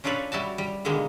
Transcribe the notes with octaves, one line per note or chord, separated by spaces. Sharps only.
C#4 D4 F4 A4 B4 C#5
G3 E4 F#4 A5
G3
B2 D3 D#3 G3 G#3 A#3